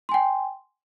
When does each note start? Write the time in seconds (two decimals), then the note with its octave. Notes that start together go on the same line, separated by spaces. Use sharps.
0.09 C6
0.12 G#5
0.14 G5